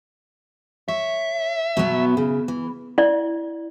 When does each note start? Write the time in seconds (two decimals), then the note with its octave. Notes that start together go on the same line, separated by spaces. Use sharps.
0.88 C#5 E5
1.77 B2 F#3 B3
2.17 C#3
2.48 E3
2.98 E4 D5